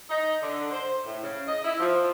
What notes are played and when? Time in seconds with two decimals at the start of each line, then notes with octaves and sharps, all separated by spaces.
0.10 D#4
0.42 D3
0.72 C5
1.05 A2
1.22 C#3
1.47 D#5
1.65 E4
1.80 F3